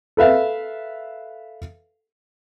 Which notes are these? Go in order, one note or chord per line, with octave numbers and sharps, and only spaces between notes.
A4 B4 E5 F5